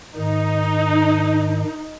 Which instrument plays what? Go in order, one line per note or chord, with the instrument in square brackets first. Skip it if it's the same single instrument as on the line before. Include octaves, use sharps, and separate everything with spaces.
[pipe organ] G#2 D#3 [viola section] D#4